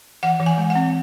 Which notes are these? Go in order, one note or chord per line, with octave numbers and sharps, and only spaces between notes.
E3 F#5
E3
G#5
G#3
F#5
C4